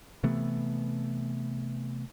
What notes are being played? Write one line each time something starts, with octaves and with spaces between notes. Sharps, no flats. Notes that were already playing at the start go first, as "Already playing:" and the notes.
C3 E3 A3 B3